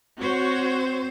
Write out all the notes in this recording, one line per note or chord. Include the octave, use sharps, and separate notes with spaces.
C4 F#4 C5 C#5